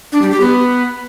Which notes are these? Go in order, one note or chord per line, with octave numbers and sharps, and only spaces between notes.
D4
G3
G4
B3